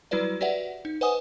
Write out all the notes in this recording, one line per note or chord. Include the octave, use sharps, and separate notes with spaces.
F#3 G3 E4 F#4 B4 D5
F#4 G4 B4 D5 E5 F#5
D#4
B4 C5 D#5 F#5 G#5 D#6